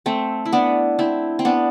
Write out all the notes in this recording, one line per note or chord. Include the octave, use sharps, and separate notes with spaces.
A3 C4
E4
B3 D4
C4 E4
C4
B3 D4